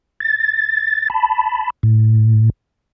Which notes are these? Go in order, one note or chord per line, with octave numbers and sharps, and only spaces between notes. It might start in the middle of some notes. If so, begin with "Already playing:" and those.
A6
A5 B5
A2